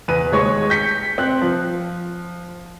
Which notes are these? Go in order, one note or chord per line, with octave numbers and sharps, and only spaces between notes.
E2 B4 D#7
D#2 G#3 C#5 C#6
G6 B6 C#7
C4 F#6
F3